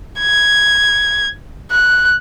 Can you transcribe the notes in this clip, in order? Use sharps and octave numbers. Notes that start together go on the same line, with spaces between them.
G#6
F#6